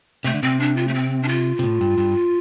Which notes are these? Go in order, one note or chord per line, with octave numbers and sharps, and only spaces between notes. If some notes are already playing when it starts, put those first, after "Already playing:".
C3 A3
D3
C3 C4
D4
F4
A3
C4
D4
F4
C3
A2
G2
G2